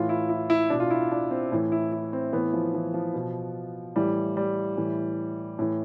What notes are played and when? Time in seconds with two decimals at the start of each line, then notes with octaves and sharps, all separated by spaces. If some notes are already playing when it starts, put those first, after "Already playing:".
Already playing: A2 E3 F4
0.09 E4
0.29 E4
0.50 E4
0.70 B2 D4
0.80 F4
0.90 E4
1.11 D4
1.31 C4
1.52 A2 E3
1.72 E4
1.92 E4
2.13 C4
2.33 A2 E3 B3
2.53 F3
2.74 E3
2.94 F3
3.14 B2
3.96 A2 E3 G3
4.37 G3
4.77 A2 E3
5.59 A2 E3